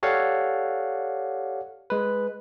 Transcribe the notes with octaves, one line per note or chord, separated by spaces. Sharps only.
G4 A4 C#5 D5 F5 F#5
G#3 B4